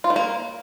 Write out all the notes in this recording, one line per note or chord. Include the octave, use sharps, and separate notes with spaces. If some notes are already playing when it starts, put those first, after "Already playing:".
F4
D#3
A#3